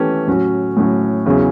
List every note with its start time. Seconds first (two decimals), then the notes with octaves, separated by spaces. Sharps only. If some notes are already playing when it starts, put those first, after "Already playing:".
Already playing: E3 A3 C#4 G4
0.27 A2 F#3 C#4 F#4
0.77 A2 F#3 C#4 F#4
1.26 E2 C#3 F#3 C#4 E4